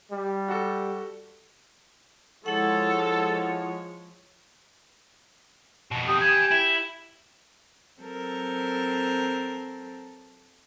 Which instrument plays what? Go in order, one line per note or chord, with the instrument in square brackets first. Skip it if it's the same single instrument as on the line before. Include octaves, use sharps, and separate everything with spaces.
[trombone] G3
[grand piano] F#4 A4
[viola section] F3 G#3 C#5 [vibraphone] E4 F#5 [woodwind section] A4
[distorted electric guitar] F2 B2
[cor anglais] G4 [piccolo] D#6
[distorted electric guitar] G#5 B5 [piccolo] G#6
[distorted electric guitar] E4
[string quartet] F#3 C4 A4 A#4